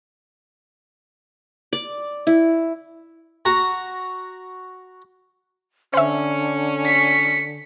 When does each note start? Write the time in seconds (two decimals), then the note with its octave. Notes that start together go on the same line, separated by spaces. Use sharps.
1.73 D5
2.27 E4
3.45 F#4 A#5
5.94 D3 C#4 C5 E5
6.86 B6 C#7